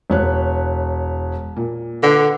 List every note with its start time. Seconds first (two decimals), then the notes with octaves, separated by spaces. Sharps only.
0.10 E1 C#5 F#6
1.56 A#2
2.03 D3 B4 F#5